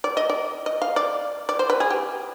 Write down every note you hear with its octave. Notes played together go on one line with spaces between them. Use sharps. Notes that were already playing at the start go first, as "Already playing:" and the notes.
D5
D#5
D5
D#5
F5
D5
D5
C5
B4
G#4
G4